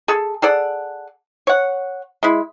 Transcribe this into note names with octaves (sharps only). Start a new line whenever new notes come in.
G#4 A4
G#4 A4 D5 F#5
C#5 F#5
G#3 E4